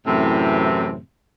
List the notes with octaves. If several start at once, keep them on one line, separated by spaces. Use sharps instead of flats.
F#2 A2 C3 E3 C4